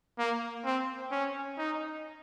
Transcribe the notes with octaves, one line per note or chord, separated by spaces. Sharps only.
A#3
C4
C#4
D#4